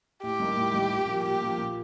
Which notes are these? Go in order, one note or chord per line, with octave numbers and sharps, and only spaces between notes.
A2 G4
G3 A#3 D#4
A2
G3 A#3 D#4
A#2
F3 A#3
A#2 G4
F3 A#3
A#2